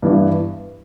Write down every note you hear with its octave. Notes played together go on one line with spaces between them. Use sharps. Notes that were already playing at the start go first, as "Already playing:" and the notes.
G2 E3 B3